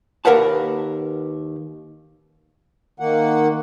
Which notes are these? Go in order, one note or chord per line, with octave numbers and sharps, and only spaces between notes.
D#2 A#4 B4 F5 F#5 A5
D#3 A#3 F#5